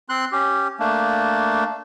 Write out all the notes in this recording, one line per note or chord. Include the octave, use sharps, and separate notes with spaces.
C4 C6 F#6
C#4 G4
A3 A#3 D4